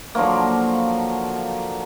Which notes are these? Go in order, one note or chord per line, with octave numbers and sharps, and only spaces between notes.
D3 F3 F#3 A#3